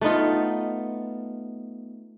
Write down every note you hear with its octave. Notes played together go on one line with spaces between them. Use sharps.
A3 B3 D#4 F4